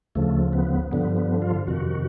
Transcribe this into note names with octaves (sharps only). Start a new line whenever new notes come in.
D2 C#3 F3 A3
B3
G2 D3 F3 B3
B3
F4
F2 C3 D#3 F#4